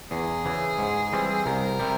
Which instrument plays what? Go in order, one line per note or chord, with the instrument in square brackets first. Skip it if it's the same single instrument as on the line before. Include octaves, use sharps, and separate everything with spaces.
[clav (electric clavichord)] E2 [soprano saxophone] G#4
[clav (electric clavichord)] C#3 E3
G#2
E3 G3 C4
[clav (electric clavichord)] C2 [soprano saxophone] A#4
[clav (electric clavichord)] C3 G3